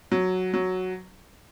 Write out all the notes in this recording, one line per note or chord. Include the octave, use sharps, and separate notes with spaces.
F#3
F#3